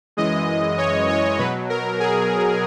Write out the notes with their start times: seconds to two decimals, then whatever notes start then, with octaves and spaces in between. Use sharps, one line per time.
0.17 F#2 E3 G#3 D#5
0.78 C#5
1.09 C#5
1.38 B2 F#3 B4
1.70 A#4
2.00 G#4